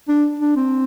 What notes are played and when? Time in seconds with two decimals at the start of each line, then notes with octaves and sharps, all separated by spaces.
0.08 D4
0.40 D4
0.56 C4